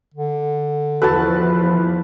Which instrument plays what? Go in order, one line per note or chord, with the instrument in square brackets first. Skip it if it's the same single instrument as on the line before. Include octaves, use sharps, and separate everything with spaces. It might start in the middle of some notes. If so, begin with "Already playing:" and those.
[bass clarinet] D3
[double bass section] E2 E3 F3 [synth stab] F#4 A4 [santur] B4 A5